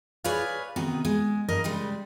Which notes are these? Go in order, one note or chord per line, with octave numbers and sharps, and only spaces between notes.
G#4 B4 C#5 D5 F5
C3 D#3 B3 F#4 G#4
G#3
G2 A#4 D#5
C#3 G3 G#3